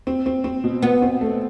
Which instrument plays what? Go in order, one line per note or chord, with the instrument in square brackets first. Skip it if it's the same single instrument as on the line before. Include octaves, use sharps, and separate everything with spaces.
[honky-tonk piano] C4
C4
C4
B2
[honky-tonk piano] B2 [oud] B3
[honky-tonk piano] C4
A3